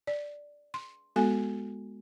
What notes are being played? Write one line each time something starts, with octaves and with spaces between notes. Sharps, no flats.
D5
C6
G#3 B3 F#4 A4 G#5